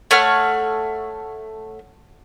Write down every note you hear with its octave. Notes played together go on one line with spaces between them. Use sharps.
A3 C#5 F#5 F6